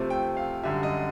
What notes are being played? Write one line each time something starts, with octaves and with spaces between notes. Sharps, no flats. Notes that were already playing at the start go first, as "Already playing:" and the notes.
Already playing: C3 F3 A3 C4
G5
F5
F#2 D3 G3 E5
D#5